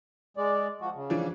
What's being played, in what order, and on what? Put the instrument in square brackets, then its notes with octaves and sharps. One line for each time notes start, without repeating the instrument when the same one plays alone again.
[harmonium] G#3 D5
F3 F#4
C#3
[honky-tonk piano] E3 F3 D4